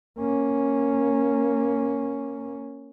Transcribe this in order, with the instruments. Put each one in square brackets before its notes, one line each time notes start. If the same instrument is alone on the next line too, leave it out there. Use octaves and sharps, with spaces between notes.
[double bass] A#3 C#4